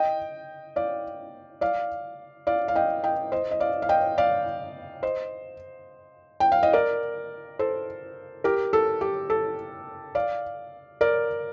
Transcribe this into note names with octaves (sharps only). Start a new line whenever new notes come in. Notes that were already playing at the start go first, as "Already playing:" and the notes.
Already playing: D#5 G5
D5 F5
D5 F5
D5 F5
F5
D#5 G5
D#5 G5
C5 D#5
D#5
D5 F5
F5
D#5 G5
D5 F5
C5 D#5
G5
F5
D#5
A#4 D5
A4 C5
G4 A#4
A4
G4
A4
D5 F5
A#4 D5